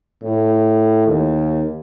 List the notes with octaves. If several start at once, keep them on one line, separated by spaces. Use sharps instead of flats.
A2
D#2